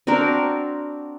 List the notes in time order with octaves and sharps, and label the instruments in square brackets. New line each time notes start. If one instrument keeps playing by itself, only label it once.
[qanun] C4 D4 F#4 A#4